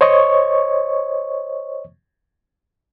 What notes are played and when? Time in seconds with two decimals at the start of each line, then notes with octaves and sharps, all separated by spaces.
0.01 C5 C#5 D#5 C#6